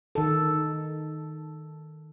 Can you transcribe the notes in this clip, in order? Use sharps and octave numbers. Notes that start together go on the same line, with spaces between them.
D#3 A4